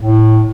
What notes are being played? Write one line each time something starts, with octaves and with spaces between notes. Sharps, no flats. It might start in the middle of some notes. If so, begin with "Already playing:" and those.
A2